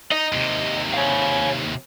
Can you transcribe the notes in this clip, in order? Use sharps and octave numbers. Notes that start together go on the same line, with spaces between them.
D#4 D#5
D#2 C3
C#5 F5